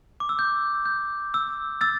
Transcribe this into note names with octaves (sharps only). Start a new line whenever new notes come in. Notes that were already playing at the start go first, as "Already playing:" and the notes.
D6
E6
G6
G6
E6
E6 A6